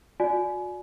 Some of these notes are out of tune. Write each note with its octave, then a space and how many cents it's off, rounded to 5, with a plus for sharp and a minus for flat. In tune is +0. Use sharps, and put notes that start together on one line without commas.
F#4 -40 D5 +0 G#5 +30